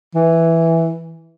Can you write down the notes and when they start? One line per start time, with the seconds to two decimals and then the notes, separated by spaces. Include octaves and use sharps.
0.15 E3